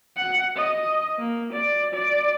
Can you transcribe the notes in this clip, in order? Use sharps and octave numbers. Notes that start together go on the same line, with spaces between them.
F#5
D#5
A#3
D5
D5